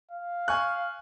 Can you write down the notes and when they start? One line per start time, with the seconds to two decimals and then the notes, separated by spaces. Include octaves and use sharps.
0.11 F5
0.48 G#5 C#6 F#6